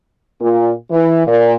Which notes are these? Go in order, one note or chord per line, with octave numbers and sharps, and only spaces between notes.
A#2
E3
A#2